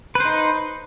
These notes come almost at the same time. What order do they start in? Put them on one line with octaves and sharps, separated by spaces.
B4 C5 D#4